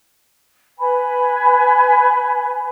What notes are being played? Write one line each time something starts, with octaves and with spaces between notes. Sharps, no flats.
B4 G#5 B5